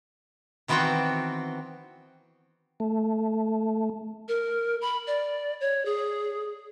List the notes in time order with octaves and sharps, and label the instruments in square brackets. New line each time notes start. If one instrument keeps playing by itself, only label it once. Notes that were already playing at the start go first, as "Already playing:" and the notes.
[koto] D#3 E3 B3 C4 F#4 G5
[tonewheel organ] A3
[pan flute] A#4
B5
D5
C#5
G#4